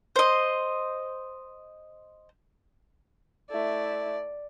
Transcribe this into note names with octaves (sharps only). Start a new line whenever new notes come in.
C5 D#5
A3 E4 D5